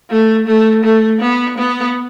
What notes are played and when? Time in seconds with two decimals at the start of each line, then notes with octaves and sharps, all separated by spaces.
0.10 A3
0.47 A3
0.84 A3
1.21 B3
1.58 B3